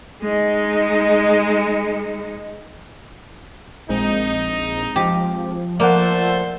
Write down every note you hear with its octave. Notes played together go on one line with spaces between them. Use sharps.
G#3 D#4
A#1 G#3 C4 D#4 G#4
F3 G4
A3 A#3 A4 C5 D5 F#5